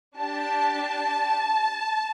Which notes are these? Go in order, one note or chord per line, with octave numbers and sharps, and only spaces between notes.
D4 G4 A5